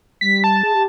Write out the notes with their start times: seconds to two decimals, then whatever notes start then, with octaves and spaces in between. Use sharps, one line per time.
0.21 G3 B6
0.44 A5
0.63 G#4
0.75 G4